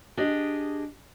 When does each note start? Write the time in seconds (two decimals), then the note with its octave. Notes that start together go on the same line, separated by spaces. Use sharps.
0.17 D4 G4 G#4 D#5